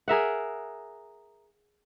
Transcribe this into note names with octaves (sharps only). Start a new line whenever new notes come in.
G#4 A#4 E5 F#5